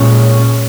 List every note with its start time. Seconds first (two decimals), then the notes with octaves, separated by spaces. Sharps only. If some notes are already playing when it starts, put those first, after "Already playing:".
Already playing: A#2 G#3 C#4